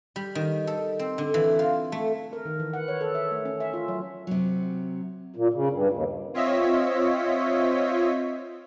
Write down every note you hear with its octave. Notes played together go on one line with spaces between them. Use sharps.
G3
D#3
A4
C4
D3
E3
F4
A3
A#4
D#3
E3
F#5
C#5
A4
E5
A3
C#4
E5
F4
F#3
C3 F#3
A#2
C#3
G2
D#2
C4 F4 C#5 D#5 E5 B6